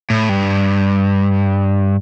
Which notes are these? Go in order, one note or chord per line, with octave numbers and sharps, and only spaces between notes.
A2
G2